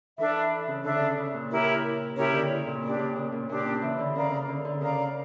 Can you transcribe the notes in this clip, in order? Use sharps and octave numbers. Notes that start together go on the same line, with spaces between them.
E3 D4 A4 E5
C#3
D3 D4 A4 E5
C#3
C#3
A#2
E4 G4 A#4 C#5
C#3 E4 G4 A#4 C#5
D3
C#3
A#2
C#3 D4 G4 D5
A#2
C#3
A#2
A#2 D4 G4 D5
C#3
E3
D3
C#3 A#4 D5 F5 A#5
C#3
D3
D3
C#3 A#4 D5 F5 A#5